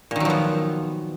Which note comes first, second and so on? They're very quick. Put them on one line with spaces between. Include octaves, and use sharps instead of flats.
A#2 D#3 F#3 F3 B3